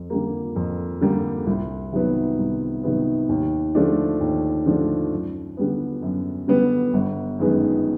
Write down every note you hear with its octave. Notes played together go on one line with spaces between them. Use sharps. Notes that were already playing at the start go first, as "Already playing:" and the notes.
Already playing: F2
D3 G3 A#3
F2
D3 G3 A#3
C2
C3 D#3 F#3 B3
C2
C3 D#3 F#3 B3
D#2
D3 F3 A3 D4
D#2
D3 F3 A3 D4
F#2
D3 G3 B3
F#2
D3 G3 B3
G1
F#2 D#3 G#3 B3